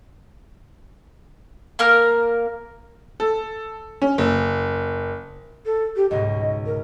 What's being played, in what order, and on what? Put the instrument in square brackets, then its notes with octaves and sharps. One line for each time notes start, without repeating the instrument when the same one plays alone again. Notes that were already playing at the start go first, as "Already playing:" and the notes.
[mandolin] A#3 A#4 F6
[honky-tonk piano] A4
C#4
F#1
[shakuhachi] A4
G4
[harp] C#2 G#2 B2 [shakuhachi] D#5
[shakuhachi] A#4